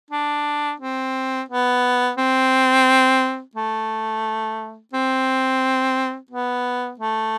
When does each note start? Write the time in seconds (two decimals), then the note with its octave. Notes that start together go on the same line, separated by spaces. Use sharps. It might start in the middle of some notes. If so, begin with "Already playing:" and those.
0.11 D4
0.80 C4
1.49 B3
2.18 C4
3.56 A3
4.94 C4
6.31 B3
7.00 A3